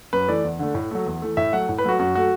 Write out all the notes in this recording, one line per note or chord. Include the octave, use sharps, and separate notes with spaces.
F#2 B4
E3 A3 D5
E2
D3 A3
A2
F#3 A3
E2
E3 A3
A2 E5
F#3 A3 F#5
A2
B4
F#3 A3 F#4
F#2 F#4
F#3 A3 F#4